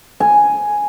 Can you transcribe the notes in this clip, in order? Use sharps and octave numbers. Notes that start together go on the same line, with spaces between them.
G#5